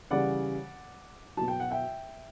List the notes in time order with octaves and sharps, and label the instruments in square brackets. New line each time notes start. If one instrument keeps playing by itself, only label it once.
[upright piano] C#3 E3 G3 D5 F#5
B2 F#3 A5
G5
F#5
E5 G5